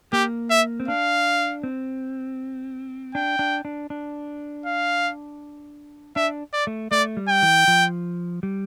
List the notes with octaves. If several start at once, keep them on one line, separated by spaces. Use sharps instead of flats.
A#3 G4
E5
C4
D4 F5
C4
D4 G5
D4
D4
D4
F5
D4 E5
D5
A3
A3 D5
G3
G5
E3
F3
G3